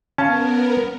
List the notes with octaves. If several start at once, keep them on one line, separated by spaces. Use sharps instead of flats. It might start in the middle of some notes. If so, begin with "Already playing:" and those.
B3 C#4 A#4 F5 A5